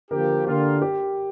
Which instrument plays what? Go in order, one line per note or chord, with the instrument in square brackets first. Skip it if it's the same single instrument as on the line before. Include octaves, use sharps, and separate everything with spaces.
[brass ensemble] D3 F3 A#3 G4 [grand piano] A#4
[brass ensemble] D3 A#3 F4 [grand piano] G4
[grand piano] G4